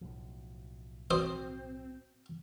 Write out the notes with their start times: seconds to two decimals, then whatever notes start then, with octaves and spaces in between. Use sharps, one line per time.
0.01 B1 A2 F3
1.11 C4 F#4 C5 D#6